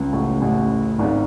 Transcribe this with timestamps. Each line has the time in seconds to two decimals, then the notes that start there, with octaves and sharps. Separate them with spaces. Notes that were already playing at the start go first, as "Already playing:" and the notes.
Already playing: C#2 C#3
0.13 A1 A2
0.41 A1 A2
0.99 G#1 G#2